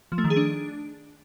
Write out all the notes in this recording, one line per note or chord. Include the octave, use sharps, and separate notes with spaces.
F3
A3
D#3
G#4
D4